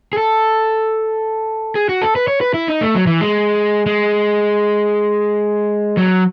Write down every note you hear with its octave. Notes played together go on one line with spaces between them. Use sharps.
G#4
A4
G#4
F#4
A4
B4
C#5
B4
E4
D#4
A3
F#3
E3
G#3
G#3
F#3